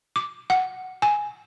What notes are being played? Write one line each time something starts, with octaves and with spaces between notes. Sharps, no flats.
D6
F#5
G#5